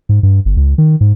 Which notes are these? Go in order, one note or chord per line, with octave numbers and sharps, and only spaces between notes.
G#2
G2
G1
C#2
D#3
G#2